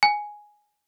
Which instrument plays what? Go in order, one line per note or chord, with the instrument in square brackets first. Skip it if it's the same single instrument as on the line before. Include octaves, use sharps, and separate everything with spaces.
[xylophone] G#5